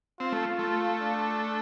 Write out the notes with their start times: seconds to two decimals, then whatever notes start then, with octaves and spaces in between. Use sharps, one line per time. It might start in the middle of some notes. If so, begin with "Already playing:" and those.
0.20 C4 F4
0.32 A3
0.59 A3
1.02 D4